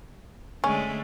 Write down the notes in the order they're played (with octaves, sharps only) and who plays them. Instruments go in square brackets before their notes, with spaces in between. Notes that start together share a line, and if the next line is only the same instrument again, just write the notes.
[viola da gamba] D3 G#3 A3 [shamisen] C#4